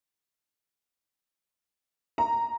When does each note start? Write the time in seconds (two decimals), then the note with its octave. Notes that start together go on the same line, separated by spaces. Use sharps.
2.18 A#5